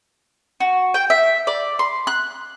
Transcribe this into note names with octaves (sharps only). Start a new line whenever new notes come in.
F#4
G5
E5
D5
C6
F#6